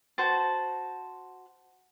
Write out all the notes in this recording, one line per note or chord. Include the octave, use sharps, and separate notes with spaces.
F#4 C5 A5